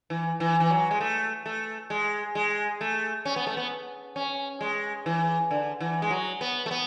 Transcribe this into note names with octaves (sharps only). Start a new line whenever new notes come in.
E3
E3
E3
F#3
G#3
A3
A3
G#3
G#3
A3
C#4
B3
A3
B3
C#4
G#3
E3
D3
E3
G#3
F#3
B3
A3
B3